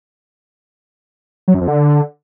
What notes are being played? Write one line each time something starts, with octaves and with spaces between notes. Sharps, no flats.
F#3
F#2
F2
D3